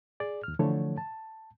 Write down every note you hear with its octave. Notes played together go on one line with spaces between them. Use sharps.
G#4 D5
D#2 F6
D3 E3 F3 A3 A4 C#5
A5